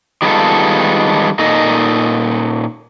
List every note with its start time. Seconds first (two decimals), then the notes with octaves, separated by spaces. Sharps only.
0.22 D#3 G3 G#3 B3 F4 A4
1.39 A#2 D#4 A4 D#5